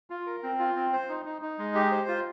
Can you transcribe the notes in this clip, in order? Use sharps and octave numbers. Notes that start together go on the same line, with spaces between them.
F4
A#4
C4
F4
C4
C5
D#4
D#4
D#4
G#3
G4
C5
F4